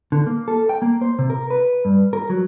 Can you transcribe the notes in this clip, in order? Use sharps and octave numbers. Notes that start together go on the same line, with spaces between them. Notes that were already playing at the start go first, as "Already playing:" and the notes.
D3
A#3
A4
G5
A#3
C5
C3
A#4
B4
G2
A#4
F#3